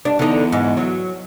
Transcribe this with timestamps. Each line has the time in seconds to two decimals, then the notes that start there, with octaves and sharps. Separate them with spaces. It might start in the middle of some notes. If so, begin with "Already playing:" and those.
0.05 G2 D4
0.19 E2 D3 D#4
0.52 G#2
0.77 F#3